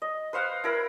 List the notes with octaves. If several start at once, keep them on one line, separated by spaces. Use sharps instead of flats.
D#5
B4 C5 F5 F#5
E4 A#4 B5